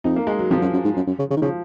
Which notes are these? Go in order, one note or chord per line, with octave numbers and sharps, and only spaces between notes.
F2 D#4
A#3
G#3
F#3
F2 F3
F#2
F#2
G#2
F#2
F#2
C#3
C#3
D#3
C#3 F3